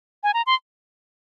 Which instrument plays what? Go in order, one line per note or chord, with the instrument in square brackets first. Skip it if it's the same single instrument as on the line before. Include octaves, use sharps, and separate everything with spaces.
[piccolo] G#5
A#5
C6